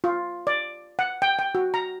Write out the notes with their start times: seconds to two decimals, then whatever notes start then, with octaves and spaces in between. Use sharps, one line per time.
0.04 F4
0.47 D5
0.99 F#5
1.22 G5
1.39 G5
1.55 F#4
1.74 A#5